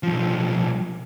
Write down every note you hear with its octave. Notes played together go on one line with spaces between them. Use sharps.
B1 F3